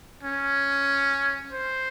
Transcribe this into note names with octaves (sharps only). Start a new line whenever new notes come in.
C#4
C5